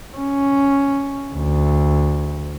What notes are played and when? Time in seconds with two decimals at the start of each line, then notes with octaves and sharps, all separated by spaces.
0.17 C#4
1.35 D2